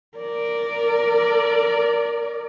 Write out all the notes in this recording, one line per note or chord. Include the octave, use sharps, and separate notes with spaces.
A#4 D5